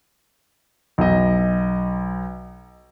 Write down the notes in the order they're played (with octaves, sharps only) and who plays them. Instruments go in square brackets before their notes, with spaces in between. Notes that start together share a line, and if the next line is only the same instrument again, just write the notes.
[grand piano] B1 D#5